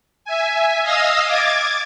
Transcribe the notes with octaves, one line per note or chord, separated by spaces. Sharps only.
E5 G#5
D#5 F5 D#6 E6 A#6
D6 G#6 A6